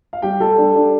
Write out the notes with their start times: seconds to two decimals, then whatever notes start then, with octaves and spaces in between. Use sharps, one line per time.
0.13 F5
0.22 G3 G4 G5
0.40 G3 A4 A5
0.58 D4
0.75 D4